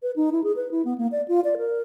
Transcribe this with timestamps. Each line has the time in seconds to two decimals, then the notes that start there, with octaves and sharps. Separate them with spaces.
0.02 B4
0.16 D#4
0.32 E4
0.44 G#4
0.56 B4
0.71 E4
0.85 B3
0.98 A#3
1.12 D5
1.28 F4
1.44 D5
1.58 A#4